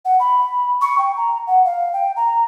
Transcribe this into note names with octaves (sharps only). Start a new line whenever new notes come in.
F#5
B5
C#6
G5
A#5
F#5
F5
G5
A#5